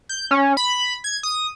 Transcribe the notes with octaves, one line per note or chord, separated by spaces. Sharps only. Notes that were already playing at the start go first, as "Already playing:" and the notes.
G6
C#4
B5
G#6
D#6